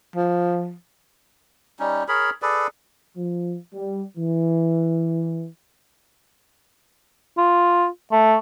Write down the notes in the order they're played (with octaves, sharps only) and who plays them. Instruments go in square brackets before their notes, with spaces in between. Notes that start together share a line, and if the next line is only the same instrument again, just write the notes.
[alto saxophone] F3
[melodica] G3 C#4 D#4
G#4 A#4 C#5 B5
G#4 A4 B4 D5
[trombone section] F3
G3
E3
[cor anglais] F4
A3